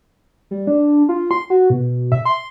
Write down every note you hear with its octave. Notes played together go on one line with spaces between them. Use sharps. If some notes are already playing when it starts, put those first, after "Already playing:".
G3
D4
F4
C6
F#4
B2
E5
C6